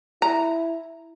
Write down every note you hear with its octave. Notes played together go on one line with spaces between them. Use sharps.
E4 A#5